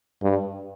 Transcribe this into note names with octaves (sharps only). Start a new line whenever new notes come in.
G2